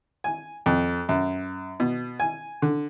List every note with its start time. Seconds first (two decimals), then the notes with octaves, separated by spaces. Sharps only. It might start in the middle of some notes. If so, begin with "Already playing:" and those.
0.24 G#5
0.66 F2
1.09 F#2
1.80 B2
2.20 G#5
2.62 D3